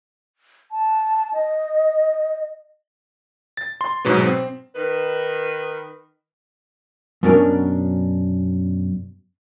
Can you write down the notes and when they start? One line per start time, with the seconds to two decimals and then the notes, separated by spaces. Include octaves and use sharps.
0.72 A5
1.34 D#5
3.57 A6
3.81 C6
4.05 G#2 B2 F#3 B3
4.23 C4
4.76 D#3 B4
7.23 F#2 B2 C#4 D4 G#4 A#4